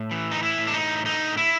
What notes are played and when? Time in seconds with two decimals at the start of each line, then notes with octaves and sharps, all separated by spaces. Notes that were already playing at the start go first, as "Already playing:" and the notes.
Already playing: A2
0.11 E3
0.31 D#4
0.43 E4
0.58 A2
0.67 D4
0.73 D#4
1.05 D3 D#4
1.37 E4